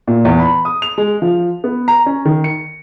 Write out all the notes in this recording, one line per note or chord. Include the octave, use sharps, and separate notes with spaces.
A#2
E2
B5
D#6
F7
G#3
F3
B3
A#5
C#4
D#3
C#7